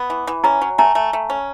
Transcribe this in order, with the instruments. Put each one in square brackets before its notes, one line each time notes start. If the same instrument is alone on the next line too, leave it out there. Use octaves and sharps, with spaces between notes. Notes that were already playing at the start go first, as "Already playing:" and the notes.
Already playing: [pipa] B3
E3
E3
[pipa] C#4 [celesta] G#5 A#5
[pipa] F#3
[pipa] A3 [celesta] G#5 A#5
[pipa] A3
A3
C#4